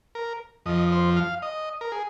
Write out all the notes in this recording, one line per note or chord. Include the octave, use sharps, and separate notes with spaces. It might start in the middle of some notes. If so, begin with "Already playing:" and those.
A#4
F2 F3 D#5
C5
F5
D#5
A#4
G#4